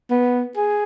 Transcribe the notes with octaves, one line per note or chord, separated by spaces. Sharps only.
B3
G#4